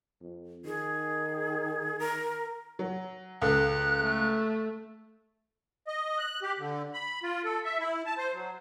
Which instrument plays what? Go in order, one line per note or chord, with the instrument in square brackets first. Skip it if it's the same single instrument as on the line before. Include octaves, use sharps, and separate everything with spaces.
[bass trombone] F2
[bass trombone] D#3 [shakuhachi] G#4
[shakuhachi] A#4
[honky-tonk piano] F#3
[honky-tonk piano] C#2 A4 [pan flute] F#6
[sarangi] A3
[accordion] D#5
F#6
G4
D3
B5
F4
A4
E5
E4
A5
C5
F#3